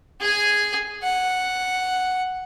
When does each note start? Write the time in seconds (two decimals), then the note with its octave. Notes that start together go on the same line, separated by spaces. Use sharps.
0.20 G#4 G#5
1.03 F#5